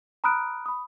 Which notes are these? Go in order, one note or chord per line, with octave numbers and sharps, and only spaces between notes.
A#5 B5 D#6 F6 F#6 D7
B5 D#6